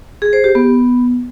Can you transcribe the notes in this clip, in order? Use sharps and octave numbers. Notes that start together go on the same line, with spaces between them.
G#4
C5
G4
B3